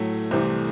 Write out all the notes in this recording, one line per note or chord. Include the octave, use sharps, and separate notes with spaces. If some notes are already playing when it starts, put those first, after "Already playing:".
Already playing: A2 F#3 A3
C2 C3 E3 A3 C5